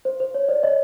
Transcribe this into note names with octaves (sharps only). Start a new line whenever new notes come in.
C5
C5
C#5
C5 D5
C#5 D#5